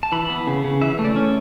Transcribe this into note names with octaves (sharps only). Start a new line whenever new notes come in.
A5
E3 B5
B3
C#3
C#3
E3 E5
A3
D5
C#4